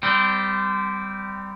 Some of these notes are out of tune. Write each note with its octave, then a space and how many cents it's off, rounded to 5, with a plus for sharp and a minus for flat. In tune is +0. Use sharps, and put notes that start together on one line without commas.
G3 +0 C4 -25